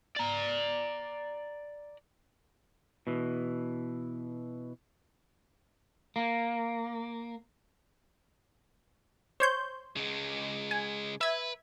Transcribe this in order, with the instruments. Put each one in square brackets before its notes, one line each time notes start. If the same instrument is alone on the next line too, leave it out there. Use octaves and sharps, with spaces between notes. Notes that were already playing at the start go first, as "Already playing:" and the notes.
[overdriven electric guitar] D5 A#5
[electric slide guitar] B2 E3
A#3
[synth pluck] C5 C#5 G6
[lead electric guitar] C#3 G#3
[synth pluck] G#5
[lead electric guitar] B4 [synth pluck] E5 G#6